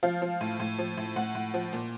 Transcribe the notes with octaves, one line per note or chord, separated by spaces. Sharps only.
F3 F5
F3
A2
A2
F3
A2
A2 F#5
A2
F3
A#2